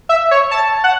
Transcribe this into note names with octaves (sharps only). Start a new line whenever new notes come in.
E5
C#5
A5
F#5